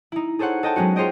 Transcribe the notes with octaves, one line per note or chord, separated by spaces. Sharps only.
D#4 E4
G#4 A4 C5 C#5 F#5
A4 D#5 G5 A5
F#3 G#3 B3 C#4 F#4
F4 G#4 C5 C#5 D#5 G5